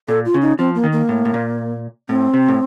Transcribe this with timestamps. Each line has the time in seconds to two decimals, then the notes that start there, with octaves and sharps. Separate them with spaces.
0.08 A#2 A4
0.25 F4
0.34 C#3
0.42 D#4
0.59 F3 C4
0.75 A#3
0.84 D#3
0.92 A#3
1.09 A2
1.25 A2
1.34 A#2
2.09 A2 C4
2.34 C3
2.48 A2